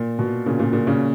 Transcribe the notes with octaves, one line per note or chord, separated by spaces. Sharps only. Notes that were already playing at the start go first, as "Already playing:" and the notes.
Already playing: A#2
B2
A#2 C#3
A#2 C#3
A#2 C#3
A#2 C#3